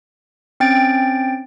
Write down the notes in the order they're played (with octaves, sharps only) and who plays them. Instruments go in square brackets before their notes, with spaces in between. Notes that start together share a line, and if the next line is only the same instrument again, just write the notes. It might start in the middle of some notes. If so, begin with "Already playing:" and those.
[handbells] C4 C#4 G5 A6 D7